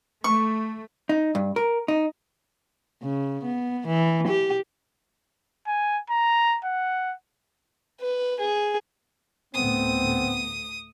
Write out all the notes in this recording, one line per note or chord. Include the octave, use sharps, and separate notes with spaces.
A3 C#6
D#4
G2
A#4
D#4
C#3
B3
E3
G4
G#5
A#5
F#5
B4
G#4
D2 A2 A3 B3 C4 D#6